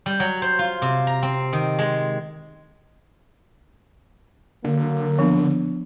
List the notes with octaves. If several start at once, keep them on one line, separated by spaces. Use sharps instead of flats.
G3
F#3
C5
F4
C3
A#5
C4
D#3
G#3
D3 F#3 A#3
F3 B3 D4